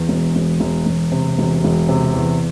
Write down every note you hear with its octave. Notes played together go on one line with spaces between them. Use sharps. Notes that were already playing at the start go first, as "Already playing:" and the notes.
Already playing: E2
E1
E1
E1
E1
C3
E1
E1
C3
E2